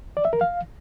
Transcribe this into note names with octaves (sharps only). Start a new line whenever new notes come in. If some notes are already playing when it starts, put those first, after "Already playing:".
D5
E5
A#4
F5